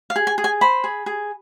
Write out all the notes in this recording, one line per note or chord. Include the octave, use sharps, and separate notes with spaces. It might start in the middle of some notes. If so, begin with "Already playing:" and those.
F5
G#4
G#5
G#4
G#5
C5 B5
G#4
G#4